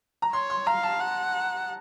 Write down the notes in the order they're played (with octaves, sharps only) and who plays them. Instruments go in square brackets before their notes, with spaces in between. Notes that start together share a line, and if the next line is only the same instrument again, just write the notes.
[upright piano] A#5
[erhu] C#5 [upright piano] C6
[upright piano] C6
[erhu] F5 [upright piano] A#5
[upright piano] A5
[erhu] F#5